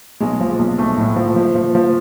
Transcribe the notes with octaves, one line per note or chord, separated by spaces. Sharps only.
B1 G#3
F3
B1
B1 A3
A2
F3
F3
F3
F3